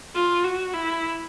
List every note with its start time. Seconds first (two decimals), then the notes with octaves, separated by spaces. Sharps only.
0.15 F4
0.44 F#4
0.74 E4